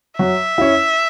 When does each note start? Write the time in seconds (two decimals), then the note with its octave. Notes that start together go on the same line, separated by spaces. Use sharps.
0.19 F#3 E5
0.58 C#4 E4